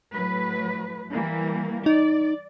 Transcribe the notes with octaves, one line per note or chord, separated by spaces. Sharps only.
A2 F#3 B4
E3 G3 A#3
D#4 D5